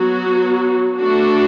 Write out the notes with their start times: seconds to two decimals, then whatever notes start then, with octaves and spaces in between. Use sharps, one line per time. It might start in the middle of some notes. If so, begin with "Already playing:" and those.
Already playing: F#3 B3 F#4
0.99 A3 D4 F#4 A4